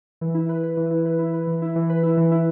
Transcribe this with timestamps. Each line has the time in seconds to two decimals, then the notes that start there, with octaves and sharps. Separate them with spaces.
0.21 E3
0.34 E4
0.49 B4
0.63 B4
0.77 E3
0.91 E4
1.06 B4
1.19 E4
1.34 B4
1.47 E3
1.62 E4
1.76 E3
1.89 B4
2.03 E4
2.17 E3
2.32 E4